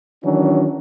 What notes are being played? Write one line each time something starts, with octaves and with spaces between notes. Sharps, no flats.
D#3 E3 F#3 C#4 D4